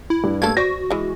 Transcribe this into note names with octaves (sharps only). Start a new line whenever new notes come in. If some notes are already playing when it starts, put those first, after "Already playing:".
E4
G2
A3 A#3 A4 G#6
F#4 C5 D5 A#6
E3 G#3